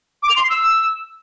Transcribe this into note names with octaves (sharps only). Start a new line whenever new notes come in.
D6
F7
C6
C7
E6